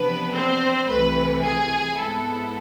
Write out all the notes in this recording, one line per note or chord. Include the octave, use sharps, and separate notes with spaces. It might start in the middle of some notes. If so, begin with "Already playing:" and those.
Already playing: E2 C3 F3 B3 D4 B4
C4 C5
C2 C3 E3 A3 B4
G#4 G#5
G#2 G#3 B3 E4 A4